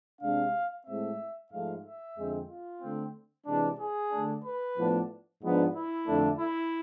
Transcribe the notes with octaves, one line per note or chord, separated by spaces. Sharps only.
C3 G#3 D4 F5
A2 G#3 C4 E5
G#2 F3 A3 F5
E5
F2 D3 G#3 C4
F4
D3 A3 C4
C3 E3 G#3 D4
G#4
D3 A3 D4
B4
A2 F3 B3 D4
G#2 F3 B3 D4
E4
F2 D3 A3 D4
E4